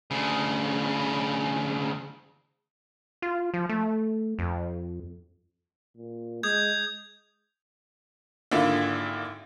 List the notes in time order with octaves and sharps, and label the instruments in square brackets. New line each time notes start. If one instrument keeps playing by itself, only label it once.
[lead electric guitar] D2 C#3
[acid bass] F4
F3
A3
F2
[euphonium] A#2
[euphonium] G#3 [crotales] D#6 G6 G#6
[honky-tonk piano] G#1 D3 A#3 E4 F4